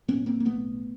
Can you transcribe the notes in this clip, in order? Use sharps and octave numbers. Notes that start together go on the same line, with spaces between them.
A2 B3 C#4
A#3 C4
A#3
B1 A3 B3